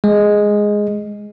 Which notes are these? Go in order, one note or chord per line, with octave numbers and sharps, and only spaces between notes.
G#3